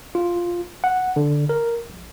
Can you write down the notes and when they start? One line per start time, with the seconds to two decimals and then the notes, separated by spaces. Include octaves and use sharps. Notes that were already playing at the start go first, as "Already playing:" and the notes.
0.15 F4
0.84 F#5
1.16 D3
1.49 A#4
1.90 A#1